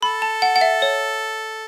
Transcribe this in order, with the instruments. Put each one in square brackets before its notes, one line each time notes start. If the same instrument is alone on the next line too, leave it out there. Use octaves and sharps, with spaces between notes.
[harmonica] A4 [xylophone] B5
[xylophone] A5
F#5
F#5
E5
C#5